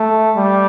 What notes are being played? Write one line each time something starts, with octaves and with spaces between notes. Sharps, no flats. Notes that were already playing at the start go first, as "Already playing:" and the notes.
Already playing: A3
G3